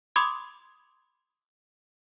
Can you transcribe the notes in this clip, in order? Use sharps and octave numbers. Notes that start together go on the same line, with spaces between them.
B5 C6 D6 D#6 G#6